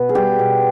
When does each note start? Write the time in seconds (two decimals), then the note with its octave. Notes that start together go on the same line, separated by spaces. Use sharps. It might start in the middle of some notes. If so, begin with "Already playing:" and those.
Already playing: B2 B4
0.09 G#4
0.15 G3 G4
0.39 B2